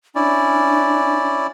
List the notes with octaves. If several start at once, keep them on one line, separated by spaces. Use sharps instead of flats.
C#4 D4 E4 D5